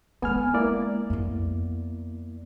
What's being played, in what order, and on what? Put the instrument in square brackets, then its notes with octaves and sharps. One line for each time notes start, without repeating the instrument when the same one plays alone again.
[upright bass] G#3 C4 [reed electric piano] B3 G#5 F6
[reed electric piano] A#3 E4 D5
[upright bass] F2 B3